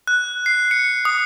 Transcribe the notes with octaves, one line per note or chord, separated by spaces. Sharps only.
F#6
C7
C#7
D#6